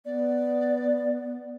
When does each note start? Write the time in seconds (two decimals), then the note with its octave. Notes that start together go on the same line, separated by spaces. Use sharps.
0.05 B3 D5